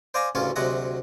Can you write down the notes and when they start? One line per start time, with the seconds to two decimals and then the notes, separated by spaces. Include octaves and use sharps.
0.14 C5 D5 F5 G#5 A#5 C6
0.35 A1 D2 C#3 C#4 F4 C#5
0.56 D2 C3 F#3 G#3 F#5 A#5